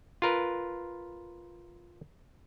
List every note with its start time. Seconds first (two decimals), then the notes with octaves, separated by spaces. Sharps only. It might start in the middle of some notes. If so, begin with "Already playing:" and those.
0.22 F4 A#4 B4